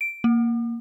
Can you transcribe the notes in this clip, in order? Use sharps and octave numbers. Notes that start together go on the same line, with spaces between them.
D7
A#3